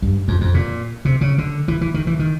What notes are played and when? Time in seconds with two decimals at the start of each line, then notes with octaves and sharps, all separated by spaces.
0.02 G2
0.28 F2
0.41 F2
0.54 A#2
1.05 C3
1.21 C#3
1.38 D3
1.68 E3
1.81 E3
1.94 D#3
2.07 E3
2.19 D#3